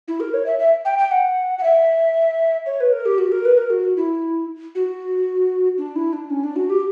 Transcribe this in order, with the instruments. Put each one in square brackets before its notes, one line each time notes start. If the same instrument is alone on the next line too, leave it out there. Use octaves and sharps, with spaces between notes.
[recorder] E4
A#4
C#5
E5
E5
G5
G5
F#5
F#5
E5
C#5
B4
A#4
G4
F#4
A#4
B4
A#4
F#4
E4
F#4
D4
E4
D4
C#4
D4
F#4
G4